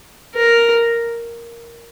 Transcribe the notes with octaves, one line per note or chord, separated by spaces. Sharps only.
A#4